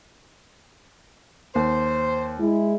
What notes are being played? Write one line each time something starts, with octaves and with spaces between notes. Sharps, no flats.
D#2 C5
G#3 E4